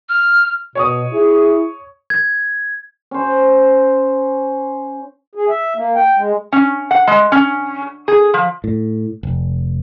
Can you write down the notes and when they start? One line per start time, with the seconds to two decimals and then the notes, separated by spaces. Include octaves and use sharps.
0.09 F6
0.75 B2 C#5 C#6 D#6
1.13 E4 G#4
2.10 G#6
3.11 C#4 C5
5.35 G#4
5.49 E5
5.76 A#3
5.95 G5
6.16 G#3
6.52 C#4
6.91 F#5
7.07 G#3
7.32 C#4
8.08 G#4
8.34 F3
8.64 A2
9.23 F1